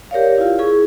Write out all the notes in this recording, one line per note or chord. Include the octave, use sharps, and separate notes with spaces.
G4 A#4 C#5 D5 F5
E4 F4
E4 G#4 C#6